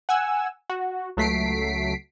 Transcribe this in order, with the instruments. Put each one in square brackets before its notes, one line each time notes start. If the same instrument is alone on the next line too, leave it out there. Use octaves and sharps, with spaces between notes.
[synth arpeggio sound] F#5 G#5 E6
F#4
C#2 F#3 A3 B6 C7 D7